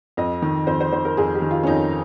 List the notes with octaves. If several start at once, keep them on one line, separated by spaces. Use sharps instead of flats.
F2 D#5
D#3
F2 C5
C5
D#3 C5
A#4
F2 G#4
G4
D#3
F4
C#4
F2 D#4